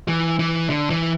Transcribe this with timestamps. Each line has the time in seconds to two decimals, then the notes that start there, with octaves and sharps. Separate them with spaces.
0.08 E3
0.39 E3
0.70 D3
0.90 E3